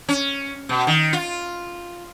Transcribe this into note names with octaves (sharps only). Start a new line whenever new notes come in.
C#4
B2
D#3
F4